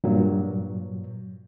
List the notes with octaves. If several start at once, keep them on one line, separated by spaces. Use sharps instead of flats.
G2 A#2 F#3